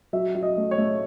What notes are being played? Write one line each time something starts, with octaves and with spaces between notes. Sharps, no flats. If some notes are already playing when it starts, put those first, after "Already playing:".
F#3 E5
F#3
D#5
A3
C#5
A3